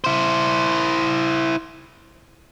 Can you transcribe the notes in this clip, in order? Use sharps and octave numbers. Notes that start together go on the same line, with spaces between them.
E4 C5